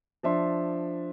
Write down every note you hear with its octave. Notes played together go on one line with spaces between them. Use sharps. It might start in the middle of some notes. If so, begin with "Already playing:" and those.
F3 D4 E5 C6